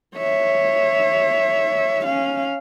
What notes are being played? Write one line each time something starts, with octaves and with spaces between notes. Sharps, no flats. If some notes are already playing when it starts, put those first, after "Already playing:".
C#5 E5
C#4 F5